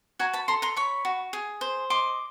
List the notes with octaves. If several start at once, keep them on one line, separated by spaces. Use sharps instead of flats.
F#4 G#5 A#5
A5 B5
A4 A#5 C6
A#5 C6
C#5 B5 C#6
F#4
G#4
C5
D#5 C6 D6